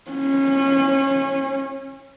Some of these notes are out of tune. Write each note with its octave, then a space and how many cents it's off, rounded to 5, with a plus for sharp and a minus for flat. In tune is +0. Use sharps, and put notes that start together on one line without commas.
C#4 -25